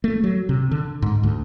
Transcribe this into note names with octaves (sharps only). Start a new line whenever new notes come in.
A3
F#3
C3
D3
G#2
D2